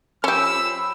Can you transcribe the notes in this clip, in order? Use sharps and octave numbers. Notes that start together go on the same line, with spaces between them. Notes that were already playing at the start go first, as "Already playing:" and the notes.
F3 C#4 G4 B5 E6